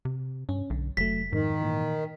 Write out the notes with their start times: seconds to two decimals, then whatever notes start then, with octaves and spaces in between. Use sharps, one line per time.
0.05 C3
0.49 G2 C#4
0.70 B1 D3
0.97 F1 F#3 A3 B6
1.33 F2 G#2 D#3
1.60 A#2 E3